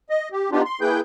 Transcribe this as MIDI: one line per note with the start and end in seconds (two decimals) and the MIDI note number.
0.10 0.29 75
0.32 0.51 67
0.52 0.62 59
0.52 0.62 62
0.52 0.62 63
0.52 0.62 65
0.52 0.62 67
0.65 0.80 84
0.81 1.01 58
0.81 1.01 64
0.81 1.01 68
0.81 1.01 71
0.81 1.01 79
0.81 1.01 91